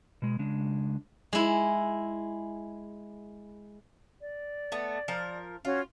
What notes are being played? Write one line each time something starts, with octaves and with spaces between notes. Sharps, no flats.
B2 G#3
C#3 G#3 D4
G#3 E4
D5
A3 B3
F3 A#4
C#4 F4 F#4